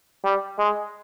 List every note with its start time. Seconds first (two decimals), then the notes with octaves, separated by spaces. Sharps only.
0.24 G3
0.59 G#3